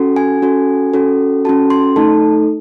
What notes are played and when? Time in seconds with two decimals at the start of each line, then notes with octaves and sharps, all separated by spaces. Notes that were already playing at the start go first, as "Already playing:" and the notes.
Already playing: C#4 F#4 A4
0.16 G#5
0.42 C#4 F#4 A4
0.94 C#4 F#4 A4
1.45 C#4 F#4 A4 A5
1.70 C6
1.96 A3 D#4 A4 A5